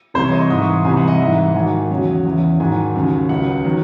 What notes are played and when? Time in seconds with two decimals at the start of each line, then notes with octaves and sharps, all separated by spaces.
0.14 C2 C3 E3 C5
0.24 C#5
0.32 D#5
0.41 C#6
0.50 G#2 E3 D#6
0.62 C#6
0.73 C6
0.84 C2 C3 E3 G#5
0.97 F#5
1.08 D#5
1.20 G#2 E3 E5
1.38 F#5
1.54 G#2 D#3 F#3 G#5
1.90 E2 C#3 F#3
2.25 E2 C#3 E3
2.59 G#2 D#3 F#3 G#5
2.95 D#2 C#3 F#3
3.29 C#2 C#3 F#3 F#5
3.65 D#3 F#3